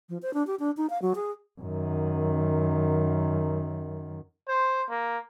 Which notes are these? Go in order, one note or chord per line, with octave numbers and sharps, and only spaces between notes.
F3
C5
D4
G4
D4
D#4
F5
F#3
G#4
F#2 D#3
C5
A#3